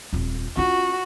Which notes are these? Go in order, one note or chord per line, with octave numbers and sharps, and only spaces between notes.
D#1 F2
C#4 F4 F#4